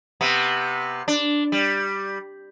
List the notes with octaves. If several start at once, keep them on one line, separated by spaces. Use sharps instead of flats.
C3 B3
D4
G3